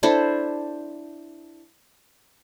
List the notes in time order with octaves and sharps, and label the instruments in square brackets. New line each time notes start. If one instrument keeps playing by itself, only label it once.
[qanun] D4 E4 A4 C5